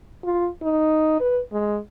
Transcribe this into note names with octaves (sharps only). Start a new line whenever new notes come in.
F4
D#4
B4
G#3